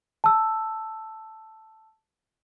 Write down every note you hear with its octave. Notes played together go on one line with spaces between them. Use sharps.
A5 E6